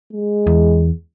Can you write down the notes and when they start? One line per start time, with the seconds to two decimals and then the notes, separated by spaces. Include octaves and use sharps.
0.13 G#3
0.47 E2